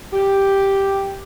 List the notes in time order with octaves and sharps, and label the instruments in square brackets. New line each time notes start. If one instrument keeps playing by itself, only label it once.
[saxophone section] G4